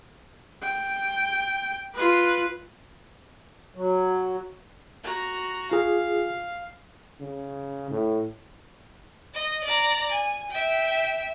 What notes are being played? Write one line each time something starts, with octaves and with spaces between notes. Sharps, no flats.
G5
F4 B4
F#3
F#4 A#5
F4 G#4 F5
C#3
A2
D#5
D5 A#5
G#5
E5 G5